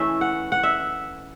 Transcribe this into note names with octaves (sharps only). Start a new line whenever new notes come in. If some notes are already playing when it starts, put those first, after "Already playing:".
Already playing: E3 A3 C#4 E5
F#5
F#5
E5